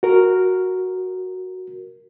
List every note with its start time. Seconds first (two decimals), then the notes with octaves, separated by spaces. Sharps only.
0.03 F#4 A#4